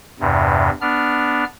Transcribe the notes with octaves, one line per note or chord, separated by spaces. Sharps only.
E2 G2 C3
B3 D4 F6